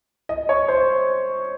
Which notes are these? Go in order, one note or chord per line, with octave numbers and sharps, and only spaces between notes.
D#5
C#5
C5